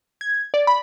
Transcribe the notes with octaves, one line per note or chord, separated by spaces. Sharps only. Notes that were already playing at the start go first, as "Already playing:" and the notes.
G#6
D5
B5